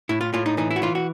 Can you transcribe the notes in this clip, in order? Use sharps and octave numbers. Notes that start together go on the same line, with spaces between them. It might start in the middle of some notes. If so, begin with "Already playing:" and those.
A2 E4
F4
A2 F4
D#4
E3 D#4
E4
F#4
E3 F4
F#4